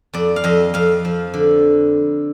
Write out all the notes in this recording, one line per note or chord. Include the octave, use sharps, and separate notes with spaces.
F2 D5
F5
F2 D#5
F2 F5
F3
D3